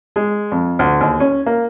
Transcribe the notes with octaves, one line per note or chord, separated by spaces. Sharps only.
G#3
F2
D2
D#2
C#4
A#3